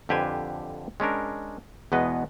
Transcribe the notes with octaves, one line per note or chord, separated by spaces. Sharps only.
F2 D3 G4 B4 C5 G#5
G#3 C#4 D4 A#4
E2 B2 G#3 B3 B4 D#5